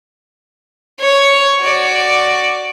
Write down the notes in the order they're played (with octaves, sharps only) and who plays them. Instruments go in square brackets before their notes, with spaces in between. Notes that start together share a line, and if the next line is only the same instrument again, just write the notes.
[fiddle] C#5
F#4 D5